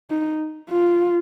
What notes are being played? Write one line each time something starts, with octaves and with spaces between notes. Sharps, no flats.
D#4
F4